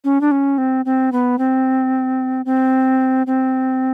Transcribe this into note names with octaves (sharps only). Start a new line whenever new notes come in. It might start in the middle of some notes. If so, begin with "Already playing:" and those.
C#4
D4
C#4
C4
C4
B3
C4
C4
C4